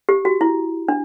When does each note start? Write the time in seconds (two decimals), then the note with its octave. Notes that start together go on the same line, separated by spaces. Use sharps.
0.09 G4
0.25 F#4
0.41 E4
0.88 D4